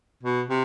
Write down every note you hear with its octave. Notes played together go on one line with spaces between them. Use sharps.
B2
C3